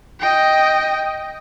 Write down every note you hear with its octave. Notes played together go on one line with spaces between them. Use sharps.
D#5 G5